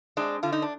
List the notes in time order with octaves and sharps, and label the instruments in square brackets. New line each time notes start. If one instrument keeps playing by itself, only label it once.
[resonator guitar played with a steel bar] G#3 C4 D4
D3 F4
D#4
D4